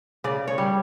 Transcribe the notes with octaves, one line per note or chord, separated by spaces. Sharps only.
C#3 D5
C#5
G3